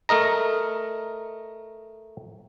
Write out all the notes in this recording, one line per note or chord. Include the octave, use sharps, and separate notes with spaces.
A3 A#4 D#5 A#5